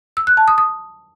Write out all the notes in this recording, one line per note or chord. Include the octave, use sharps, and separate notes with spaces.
E6
F#6
A5
D#6
D#6